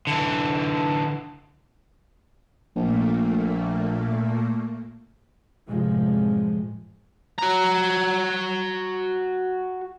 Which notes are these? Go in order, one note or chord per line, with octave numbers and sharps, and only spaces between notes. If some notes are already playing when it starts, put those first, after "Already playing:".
D3 E3
A#1 A#2 A3 A#3
F#2 A2 C3 F3 G#3
F#4 A#5